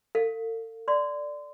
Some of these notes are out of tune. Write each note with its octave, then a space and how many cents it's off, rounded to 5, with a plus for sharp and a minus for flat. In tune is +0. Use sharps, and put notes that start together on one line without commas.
A4 +40 F5 +20
D5 +0 C6 -30